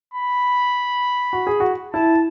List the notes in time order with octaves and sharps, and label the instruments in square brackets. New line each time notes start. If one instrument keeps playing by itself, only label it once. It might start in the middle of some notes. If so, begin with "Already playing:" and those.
[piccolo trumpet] B5
[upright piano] F#4
G#4
F#4
[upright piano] E4 [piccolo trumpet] A5